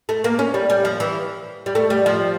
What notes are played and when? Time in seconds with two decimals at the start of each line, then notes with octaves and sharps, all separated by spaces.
0.09 A3
0.24 A#3
0.39 C#4
0.54 G3
0.70 G3
0.85 F3
1.00 E3
1.66 G3
1.75 A3
1.90 G3
2.06 F3